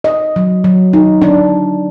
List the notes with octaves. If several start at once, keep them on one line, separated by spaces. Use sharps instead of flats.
D#5
F#3
F#3
D#4
D4